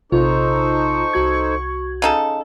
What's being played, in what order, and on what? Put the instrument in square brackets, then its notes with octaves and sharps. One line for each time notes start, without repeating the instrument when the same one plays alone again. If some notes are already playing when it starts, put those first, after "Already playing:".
[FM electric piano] A#1 C3 F4 [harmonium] D#4 A4 C5 [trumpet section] C#6
[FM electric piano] C2 F#4 G#6
[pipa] C#3 D#4 A4